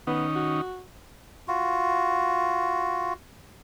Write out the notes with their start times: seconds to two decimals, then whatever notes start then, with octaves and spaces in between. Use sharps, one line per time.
0.07 D#3 B3 C#4 D#4
0.35 F#4
1.48 F4 F#4